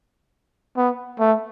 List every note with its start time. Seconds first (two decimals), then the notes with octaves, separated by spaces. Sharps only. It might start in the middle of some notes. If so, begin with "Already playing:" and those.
0.77 B3
1.19 A3